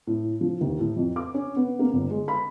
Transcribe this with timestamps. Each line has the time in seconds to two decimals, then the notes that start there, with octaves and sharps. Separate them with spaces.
0.07 A2
0.41 F3
0.61 D#2
0.79 A2
0.96 F2
1.16 D6
1.34 C#4
1.56 B3
1.79 A#3
1.93 G1
2.10 G#3
2.28 B5